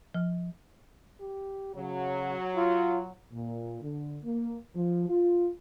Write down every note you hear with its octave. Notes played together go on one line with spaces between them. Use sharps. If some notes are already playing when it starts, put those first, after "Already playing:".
F3
G4
C#3 F#3
F4
A#2
D3
A#3
F3
F4